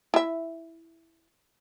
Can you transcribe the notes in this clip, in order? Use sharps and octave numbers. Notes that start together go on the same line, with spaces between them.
E4 E5